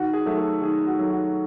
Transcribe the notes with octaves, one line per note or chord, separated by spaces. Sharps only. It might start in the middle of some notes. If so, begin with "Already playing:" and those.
Already playing: D#3 F#4
G#4
F#3 A3
A4
D#3 G#4
F#4
F#3 A3
F#4